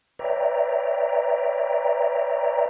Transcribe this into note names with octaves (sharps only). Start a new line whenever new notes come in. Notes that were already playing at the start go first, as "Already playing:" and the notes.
B4 C#5 D5 E5 G5 A#5